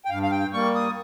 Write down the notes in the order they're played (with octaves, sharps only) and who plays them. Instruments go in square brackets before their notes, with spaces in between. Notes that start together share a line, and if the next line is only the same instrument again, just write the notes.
[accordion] G5
G2 F5
F5
G5
G3 A#3 C#6
D#6